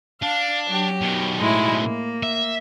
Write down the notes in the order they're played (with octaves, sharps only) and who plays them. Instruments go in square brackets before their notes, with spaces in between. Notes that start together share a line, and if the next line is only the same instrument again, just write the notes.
[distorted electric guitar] D4 [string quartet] F5
[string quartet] F#3 G4
[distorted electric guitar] B2 D#3
[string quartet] A2 G#3 E4
A#3
[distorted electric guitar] E5